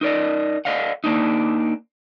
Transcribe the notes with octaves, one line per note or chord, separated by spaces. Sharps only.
D#4 A#4 D5 D#5
A4 D5 D#5 F5 F#5
A#3 D4 D#4